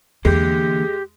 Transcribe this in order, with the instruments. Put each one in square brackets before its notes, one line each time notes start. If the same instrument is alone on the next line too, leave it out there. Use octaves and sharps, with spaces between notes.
[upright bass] E2 [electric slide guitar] D3 E3 A#3 [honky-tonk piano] G#3 [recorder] G4